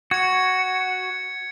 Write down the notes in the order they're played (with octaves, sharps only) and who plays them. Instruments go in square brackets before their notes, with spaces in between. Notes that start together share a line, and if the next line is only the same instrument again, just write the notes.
[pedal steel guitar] F#4 [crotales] G#6 C#7